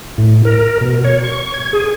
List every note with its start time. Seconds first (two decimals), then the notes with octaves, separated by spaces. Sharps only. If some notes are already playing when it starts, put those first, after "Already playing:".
0.18 A2
0.45 A#4
0.81 B2
1.04 C#5
1.24 C#6
1.54 G#6
1.73 G#4